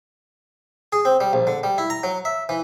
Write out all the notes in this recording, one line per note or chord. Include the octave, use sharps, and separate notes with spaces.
G#4
C4
G3
A#1
D3
G3
E4
A#5
F#3
E5
E3